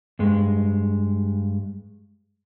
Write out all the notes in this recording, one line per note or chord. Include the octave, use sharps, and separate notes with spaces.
G2 G#3